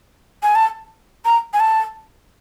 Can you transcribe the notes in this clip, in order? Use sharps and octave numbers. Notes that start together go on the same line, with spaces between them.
G#5
A5
A#5
G#5
A5